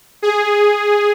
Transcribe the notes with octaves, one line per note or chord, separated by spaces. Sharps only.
G#4